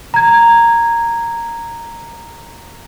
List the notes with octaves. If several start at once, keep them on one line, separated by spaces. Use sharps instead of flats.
A#5 G#6